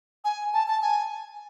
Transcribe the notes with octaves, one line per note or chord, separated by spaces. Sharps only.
G#5
A5
A5
G#5